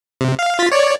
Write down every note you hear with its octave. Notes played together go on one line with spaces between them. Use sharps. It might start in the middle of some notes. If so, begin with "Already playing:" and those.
C3
F5
F4 A6 B6
C#5 D5